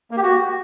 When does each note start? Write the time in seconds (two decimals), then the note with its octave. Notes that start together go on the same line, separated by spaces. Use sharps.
0.11 A#3
0.17 G4
0.23 F#4